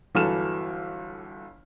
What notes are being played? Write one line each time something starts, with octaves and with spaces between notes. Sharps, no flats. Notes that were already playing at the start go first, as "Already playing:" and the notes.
G1 E3 F#3 A4 F6 E7